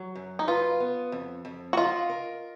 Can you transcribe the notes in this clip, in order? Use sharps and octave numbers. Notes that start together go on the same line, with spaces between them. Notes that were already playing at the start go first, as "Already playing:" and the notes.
Already playing: F#3
F#2
D#4
F4 B4
B3
F2
F2
F#4
F4 D#5
A#4